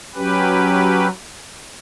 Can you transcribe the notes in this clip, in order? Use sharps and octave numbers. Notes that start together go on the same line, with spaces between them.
F#3 C#4 G4 B4